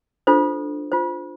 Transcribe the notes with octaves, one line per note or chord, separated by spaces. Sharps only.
D4 F4 A4 C5
F4 C5